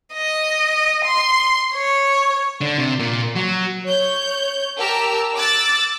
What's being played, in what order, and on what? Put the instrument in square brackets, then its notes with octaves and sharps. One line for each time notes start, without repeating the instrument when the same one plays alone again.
[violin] D#5
C6
C#5
[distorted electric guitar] D3
C3
A#2
F#3
[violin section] C#5 G6
G4 A#4 A5 A#5 E6
D6 E6 F#6 A6